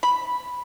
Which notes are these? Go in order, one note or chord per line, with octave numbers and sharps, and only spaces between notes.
B5